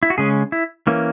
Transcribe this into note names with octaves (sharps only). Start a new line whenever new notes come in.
E4
F#4
C#3 G#3 C#4 G#4
E4
E3 A#3 C#4